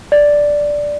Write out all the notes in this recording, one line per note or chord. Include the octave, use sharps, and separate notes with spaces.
D5